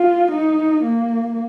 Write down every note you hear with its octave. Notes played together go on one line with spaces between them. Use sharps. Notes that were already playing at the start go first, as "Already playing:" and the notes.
Already playing: F4
D#4
A#3